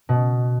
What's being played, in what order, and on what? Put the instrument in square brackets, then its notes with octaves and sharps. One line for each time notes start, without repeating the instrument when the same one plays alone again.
[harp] B2